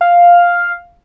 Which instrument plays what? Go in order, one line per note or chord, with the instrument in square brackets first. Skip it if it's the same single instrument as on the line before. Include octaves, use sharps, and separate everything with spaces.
[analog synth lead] F5